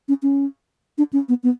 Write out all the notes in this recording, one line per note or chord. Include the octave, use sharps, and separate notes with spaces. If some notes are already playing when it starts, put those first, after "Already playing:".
C#4
C#4
D4
C#4
B3
B3